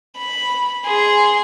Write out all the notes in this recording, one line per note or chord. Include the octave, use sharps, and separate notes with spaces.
B5
G#4 C6